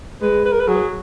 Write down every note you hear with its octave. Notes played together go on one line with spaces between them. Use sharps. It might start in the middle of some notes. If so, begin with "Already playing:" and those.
G#3 B4
B4
A#4
B4
F#3 G#4